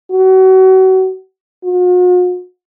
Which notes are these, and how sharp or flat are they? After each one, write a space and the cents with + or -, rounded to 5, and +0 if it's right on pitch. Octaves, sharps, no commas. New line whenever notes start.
F#4 +30
F#4 -45